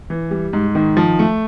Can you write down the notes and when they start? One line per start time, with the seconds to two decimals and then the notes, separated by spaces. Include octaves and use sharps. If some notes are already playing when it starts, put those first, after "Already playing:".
0.10 E3
0.31 G3
0.53 G#2
0.75 D#3
0.97 F3
1.19 A3